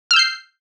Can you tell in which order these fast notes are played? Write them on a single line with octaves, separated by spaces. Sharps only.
F6 E6 G6 C7